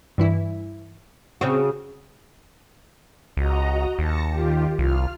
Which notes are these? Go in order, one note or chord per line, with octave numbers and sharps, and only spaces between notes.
G2 E3 E4
C#3 C4 F#4
C#2 F#4 D#5 A#5
D#2 A5 A#6 C#7
D#3 F4 G4
C2 F4 F6